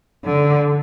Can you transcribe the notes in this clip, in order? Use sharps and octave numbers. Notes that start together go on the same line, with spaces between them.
D3